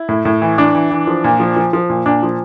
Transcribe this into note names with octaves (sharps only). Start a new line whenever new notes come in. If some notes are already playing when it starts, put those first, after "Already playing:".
Already playing: E4
A2
A2
E3
E3 D4
E3
E3
F3
A#2
F3
F3
F3
A#2
A#2 D4
F3